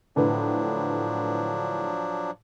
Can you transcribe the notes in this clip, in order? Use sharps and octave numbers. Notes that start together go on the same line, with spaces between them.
A2 D3 F3 F#3 D4 B4